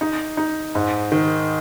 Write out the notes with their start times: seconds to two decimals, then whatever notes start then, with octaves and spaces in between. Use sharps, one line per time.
0.01 D#4
0.37 D#4
0.75 G#2
1.12 D#3